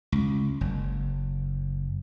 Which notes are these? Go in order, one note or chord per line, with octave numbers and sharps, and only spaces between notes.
C#2
F#1